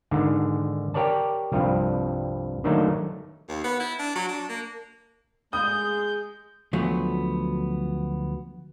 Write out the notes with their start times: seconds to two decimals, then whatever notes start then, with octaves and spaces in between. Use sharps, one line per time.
0.11 G#2 D3 D#3
0.94 G4 A#4 C#5 D5 A5
1.52 C2 G2 F3 G3
2.64 D3 D#3 F#3 A3 A#3 D#4
3.49 D#2
3.64 B3
3.80 E4
3.99 D4
4.15 F#3
4.29 D4
4.49 A#3
5.53 G#3 D#6 G6
6.73 D2 F3 F#3 A3 B3